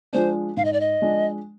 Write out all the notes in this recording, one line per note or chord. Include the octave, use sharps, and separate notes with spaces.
F3 G#3 D4 C5
G#2 F5
D#5
D5
D#5
F3 G#3 D4